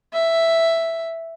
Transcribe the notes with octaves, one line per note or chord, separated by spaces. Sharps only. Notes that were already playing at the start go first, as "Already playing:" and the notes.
E5